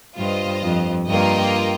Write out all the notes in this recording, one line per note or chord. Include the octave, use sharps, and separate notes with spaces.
G2 F4 C5 D#5
F2
G2 A#3 F4 A#4 D#5 G5